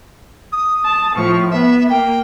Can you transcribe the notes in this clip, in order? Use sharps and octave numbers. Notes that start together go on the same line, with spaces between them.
D#6
A5
A2 F3 C#6
B3 E5
A#3 G5